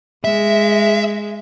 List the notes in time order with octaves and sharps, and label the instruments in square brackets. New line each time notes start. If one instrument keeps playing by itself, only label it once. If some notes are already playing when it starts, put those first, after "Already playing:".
[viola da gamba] G#3 [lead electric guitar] E5